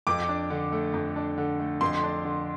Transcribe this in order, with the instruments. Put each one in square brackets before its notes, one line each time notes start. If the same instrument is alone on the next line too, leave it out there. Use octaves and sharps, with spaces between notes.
[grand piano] F2 [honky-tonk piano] D6
[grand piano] D4
D3
A3
F2
D4
D3
A3
[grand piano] F2 [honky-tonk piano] C6
[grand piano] D4
D3